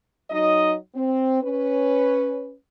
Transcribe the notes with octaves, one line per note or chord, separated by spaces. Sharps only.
F#3 D#4 D#5
C4
C#4 B4